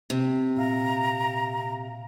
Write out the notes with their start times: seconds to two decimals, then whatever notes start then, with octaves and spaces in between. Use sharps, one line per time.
0.10 C3 C4
0.57 A#2 E5 F5 A#5